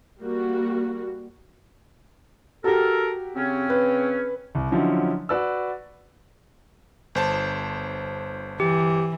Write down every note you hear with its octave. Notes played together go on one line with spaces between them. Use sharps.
G3 A#3 F#4
F#4 G4 A4 A#4
C#3 C4 C#4
B4
C2
D3 F3 F#3 C#4 D#4 E4
F#4 B4 D5 E6
G1 C5 A5
E3 G4